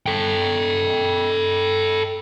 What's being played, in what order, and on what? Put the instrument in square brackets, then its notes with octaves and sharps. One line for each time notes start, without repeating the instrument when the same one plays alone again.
[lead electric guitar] A4 G5